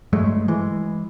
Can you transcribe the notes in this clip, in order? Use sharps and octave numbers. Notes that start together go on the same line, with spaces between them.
G2 F#3 G#3 A3
E3 G#3